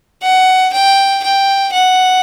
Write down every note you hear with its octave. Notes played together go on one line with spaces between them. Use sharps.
F#5
G5
G5
F#5